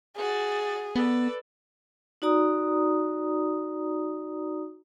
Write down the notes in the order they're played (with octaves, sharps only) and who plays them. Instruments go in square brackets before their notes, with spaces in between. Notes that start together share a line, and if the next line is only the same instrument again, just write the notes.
[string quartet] F#4 A6 [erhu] G#4
[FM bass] B3 [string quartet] A4 B4 D5
[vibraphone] D#4 F#4 D5 A#5 D#6